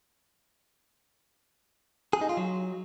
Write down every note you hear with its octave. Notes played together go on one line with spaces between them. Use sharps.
G#4
D#4
F4
F#3